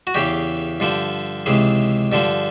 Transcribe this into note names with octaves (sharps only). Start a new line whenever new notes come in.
F#4
E2 C#3 E3 G4
G2 D3 F3
C#2 C3 E3 G#4
G2 D3 F3